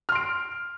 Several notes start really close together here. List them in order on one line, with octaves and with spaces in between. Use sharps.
F6 C6 D7